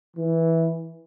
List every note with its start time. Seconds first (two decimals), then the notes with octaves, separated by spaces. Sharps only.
0.17 E3